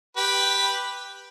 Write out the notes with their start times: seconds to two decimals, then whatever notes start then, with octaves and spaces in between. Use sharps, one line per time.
0.17 G4 B4